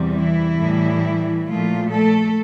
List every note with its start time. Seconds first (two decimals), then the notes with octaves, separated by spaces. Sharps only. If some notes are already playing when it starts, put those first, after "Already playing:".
Already playing: E2 C3 G3
0.17 E3 E4
0.60 A2 G3
1.48 A#2 F3 A3 F4
1.92 A3 A4